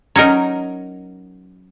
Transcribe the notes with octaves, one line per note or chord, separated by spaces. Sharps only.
F#3 C#4 D#4 A#4